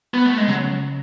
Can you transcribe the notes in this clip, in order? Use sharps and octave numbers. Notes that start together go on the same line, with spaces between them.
B3
A3
G#3
C#3 F#3